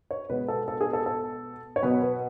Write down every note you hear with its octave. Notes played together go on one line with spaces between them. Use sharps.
C#5
B2 G#3 B3 B4
A4
A4
G#4
A4
A4
C#5
B2 F#3 B3 B4
B4